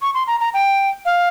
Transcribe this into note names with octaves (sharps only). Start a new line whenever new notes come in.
C#6
C6
A#5
A#5
G5
F5